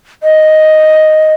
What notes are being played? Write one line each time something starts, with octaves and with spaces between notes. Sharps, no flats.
D#5